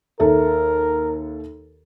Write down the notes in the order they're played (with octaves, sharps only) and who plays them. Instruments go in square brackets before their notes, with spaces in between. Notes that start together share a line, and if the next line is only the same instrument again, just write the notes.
[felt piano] D#2 A4 E5 [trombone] A#4